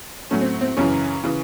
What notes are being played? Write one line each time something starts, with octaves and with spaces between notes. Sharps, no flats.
A2 F#3 A3 C#4
C4
C4
F#2 C#3 E3 C#4
C#3 E3